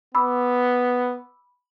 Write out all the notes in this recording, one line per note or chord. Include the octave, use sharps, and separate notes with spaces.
B3 B5 D6 E6